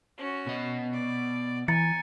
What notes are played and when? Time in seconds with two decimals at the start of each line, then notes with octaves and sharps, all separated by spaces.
0.18 C#4 F#4
0.47 B2 D#5
0.93 D5
1.68 E3 G#5 A#5 A6 C#7